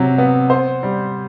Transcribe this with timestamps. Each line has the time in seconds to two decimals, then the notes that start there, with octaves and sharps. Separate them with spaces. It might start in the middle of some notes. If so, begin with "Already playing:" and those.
Already playing: C3 F#3
0.18 B3
0.50 C5
0.83 G3